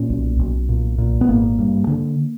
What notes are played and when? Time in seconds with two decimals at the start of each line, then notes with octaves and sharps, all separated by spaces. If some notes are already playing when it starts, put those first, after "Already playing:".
Already playing: A#2 C#4
0.10 B1
0.39 B1
0.69 A#2
0.98 A#2
1.21 B3
1.29 G#1 A#3
1.59 G2
1.87 D3